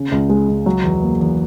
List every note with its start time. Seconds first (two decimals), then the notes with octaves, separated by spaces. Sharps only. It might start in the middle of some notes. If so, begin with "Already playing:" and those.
Already playing: C#3
0.12 C#2
0.29 G#3
0.48 C#2
0.66 F#3
0.83 E2
1.01 A#3
1.20 E2